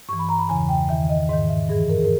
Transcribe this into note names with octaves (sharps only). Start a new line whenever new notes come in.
G2 E3 C#6
B5
A#5
B5
E2 C#3 E3 G#5
G5
E2 D#3 E5
D#5
G#2 D#3 D#5
E5
G2 E3 G#4
A#4
G#4
A#4